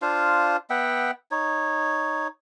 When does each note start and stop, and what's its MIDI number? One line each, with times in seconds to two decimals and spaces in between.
0.02 0.57 62
0.02 0.57 65
0.02 0.57 72
0.02 0.57 77
0.70 1.11 59
0.70 1.11 76
0.70 1.11 78
0.70 1.11 79
1.31 2.28 63
1.31 2.28 73